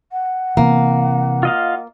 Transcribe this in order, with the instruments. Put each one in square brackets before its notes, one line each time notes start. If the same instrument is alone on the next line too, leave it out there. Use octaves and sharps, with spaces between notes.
[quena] F#5
[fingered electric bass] C3 E3 [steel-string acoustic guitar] A#3
[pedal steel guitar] F4 D#5 F5